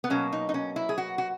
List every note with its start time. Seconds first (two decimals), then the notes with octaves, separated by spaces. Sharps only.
0.04 B3
0.10 B2 F#3 A#3 C#4
0.32 D#4
0.49 D#4
0.54 C#4
0.76 E4
0.89 G#4
0.98 F#4
1.18 F#4